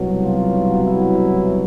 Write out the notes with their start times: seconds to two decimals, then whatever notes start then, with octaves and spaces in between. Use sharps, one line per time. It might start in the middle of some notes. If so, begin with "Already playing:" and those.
Already playing: C2 B2 F#3
0.22 F4
0.81 E4